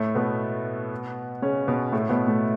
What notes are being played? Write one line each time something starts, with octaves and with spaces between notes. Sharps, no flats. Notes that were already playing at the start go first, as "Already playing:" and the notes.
Already playing: A2 A3
B2 B3
C#3 C#4
B2 B3
A2 A3
B2 B3
A2 A3